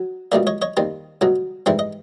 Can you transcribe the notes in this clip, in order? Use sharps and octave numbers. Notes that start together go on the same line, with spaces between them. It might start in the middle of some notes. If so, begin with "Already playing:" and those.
Already playing: F#3
C#2 B2 G3 A#3 D5 E5
C#5 D#5
C#5 D#5
D#2 D#3 G3 C4
C2 B2 F#3
G#2 E3 G3 C4 E5
D#5